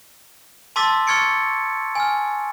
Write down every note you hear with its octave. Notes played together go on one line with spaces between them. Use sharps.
A5 C6 D6 E6 A6 B6
C#6 F6 G#6 A6 C#7 D7
G#5 F6